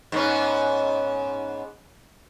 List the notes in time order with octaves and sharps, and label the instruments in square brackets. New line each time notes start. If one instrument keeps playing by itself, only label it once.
[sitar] G#2 B3 C#4